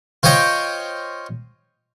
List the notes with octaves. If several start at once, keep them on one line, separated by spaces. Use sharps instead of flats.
F4 C5 C#5 D#5 G5